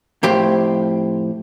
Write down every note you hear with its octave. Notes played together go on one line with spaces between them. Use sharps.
F2 A2 G4 C5